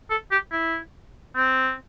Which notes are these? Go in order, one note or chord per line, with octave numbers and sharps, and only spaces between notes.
A4
G4
E4
C4